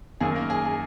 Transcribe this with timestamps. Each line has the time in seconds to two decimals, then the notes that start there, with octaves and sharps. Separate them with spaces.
0.21 F#2 D#3 A#3 G#4
0.35 A#3 A#4
0.50 G#4
0.65 G#4